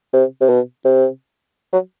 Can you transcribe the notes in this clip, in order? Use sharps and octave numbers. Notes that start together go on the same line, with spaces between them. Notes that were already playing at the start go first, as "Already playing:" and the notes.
C3
C3
B2
C3
F#3